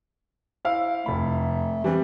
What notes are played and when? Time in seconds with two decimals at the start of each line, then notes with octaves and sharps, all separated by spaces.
0.65 E4 C5 F5
1.06 F1 A3 B5
1.84 E3 G3 C4